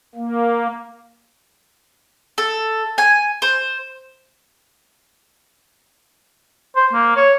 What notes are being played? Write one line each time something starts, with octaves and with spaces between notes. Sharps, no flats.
A#3
A4
G#5
C5
C5
A#3
C#5